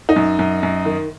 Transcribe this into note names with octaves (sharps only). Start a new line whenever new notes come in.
D#4
F#2
F#2
F#2
D#3